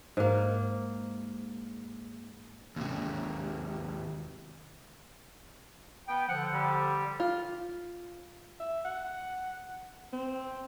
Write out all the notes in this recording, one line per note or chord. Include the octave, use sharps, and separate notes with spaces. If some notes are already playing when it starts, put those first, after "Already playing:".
G#2 A#3
D#2 C3
B3 G5
D3 F3 F#5
G3
F4
E5
F#5
C4